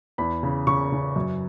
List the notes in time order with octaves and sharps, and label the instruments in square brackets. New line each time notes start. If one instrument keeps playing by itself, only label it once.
[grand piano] E2 B5
C#3
C#3 C#6
C#3
F#2